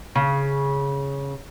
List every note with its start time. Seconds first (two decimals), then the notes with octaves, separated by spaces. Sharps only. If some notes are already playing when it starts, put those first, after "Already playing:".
0.16 C#3